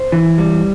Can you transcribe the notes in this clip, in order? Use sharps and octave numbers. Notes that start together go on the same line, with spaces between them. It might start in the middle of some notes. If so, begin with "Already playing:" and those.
Already playing: C5
E3
G3